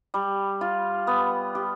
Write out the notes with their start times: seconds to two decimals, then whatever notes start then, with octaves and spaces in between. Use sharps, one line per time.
0.14 G3
0.61 F4
1.07 B3
1.55 G4